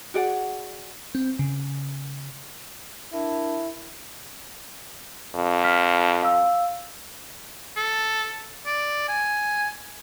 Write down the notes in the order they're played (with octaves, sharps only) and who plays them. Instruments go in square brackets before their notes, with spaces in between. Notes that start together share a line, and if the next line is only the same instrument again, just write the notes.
[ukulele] F#4 G#4 D5 F#5
[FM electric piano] C4
C#3
[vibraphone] D4 A#4 A5 [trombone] E4
[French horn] F2
[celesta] F6 B6
F5 E6
[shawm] A4
D5
G#5